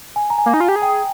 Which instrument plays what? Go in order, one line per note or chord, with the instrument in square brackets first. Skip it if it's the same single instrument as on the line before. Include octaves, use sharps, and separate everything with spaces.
[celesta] G#5
A#5
G#5
[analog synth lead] A#3
D#4
F4
G4
G#4
[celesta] G5